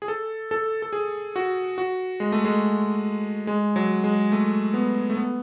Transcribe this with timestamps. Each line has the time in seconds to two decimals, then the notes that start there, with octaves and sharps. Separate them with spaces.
0.02 G#4
0.08 A4
0.51 A4
0.82 A4
0.93 G#4
1.36 F#4
1.78 F#4
2.20 G#3
2.32 A3
2.45 G#3
3.47 G#3
3.76 F#3
4.04 G#3
4.32 A3
4.74 B3
5.10 A3
5.17 B3